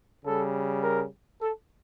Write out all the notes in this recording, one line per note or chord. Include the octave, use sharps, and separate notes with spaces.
C#3 G3 A4
A#4
A4